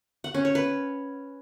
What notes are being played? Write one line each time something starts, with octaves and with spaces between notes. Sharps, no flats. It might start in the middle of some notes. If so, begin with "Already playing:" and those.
F#5
C#4
C#5
B4